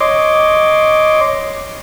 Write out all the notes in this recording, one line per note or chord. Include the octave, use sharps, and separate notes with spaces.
C#5 D#5 C6 D6